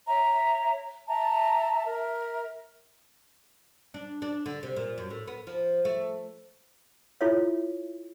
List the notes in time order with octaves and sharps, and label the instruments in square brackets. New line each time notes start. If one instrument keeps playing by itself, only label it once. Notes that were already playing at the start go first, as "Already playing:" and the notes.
[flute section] C#5 E5 A#5
E5 A5 A#5
A#4 E5
[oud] D4
D4
D3
C3
A#2
F#2
A2
B3
F3
A3
[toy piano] E4 F4 A4 C#5 E5